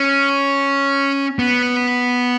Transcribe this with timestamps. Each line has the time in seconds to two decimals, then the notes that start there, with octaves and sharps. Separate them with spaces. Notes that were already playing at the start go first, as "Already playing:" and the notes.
Already playing: C#4
1.39 B3